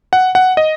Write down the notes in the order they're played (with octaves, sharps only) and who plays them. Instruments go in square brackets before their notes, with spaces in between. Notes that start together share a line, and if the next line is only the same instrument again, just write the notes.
[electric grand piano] F#5
F#5
D#5